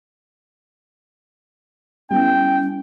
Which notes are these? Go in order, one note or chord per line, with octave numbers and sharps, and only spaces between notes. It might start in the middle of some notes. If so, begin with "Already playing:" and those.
G3 B3 C#4 E4 G5